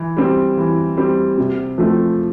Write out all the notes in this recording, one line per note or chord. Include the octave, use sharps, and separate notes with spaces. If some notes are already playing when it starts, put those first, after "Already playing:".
Already playing: E3
G3 C4
E3
G3 C4
C3
F3 A3 C4